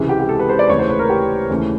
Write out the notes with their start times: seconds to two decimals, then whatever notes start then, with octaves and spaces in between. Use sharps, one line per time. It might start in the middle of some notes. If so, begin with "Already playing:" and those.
Already playing: C#2 C3 E3 G#3 C#4
0.09 G4
0.19 G4
0.29 A4
0.39 B4
0.49 C5
0.59 D5
0.69 D#2 C#3 E3 A3 C#5
0.79 C5
0.89 B4
0.99 A#4
1.10 G4
1.50 D#2 C#3 E3 A3 C#4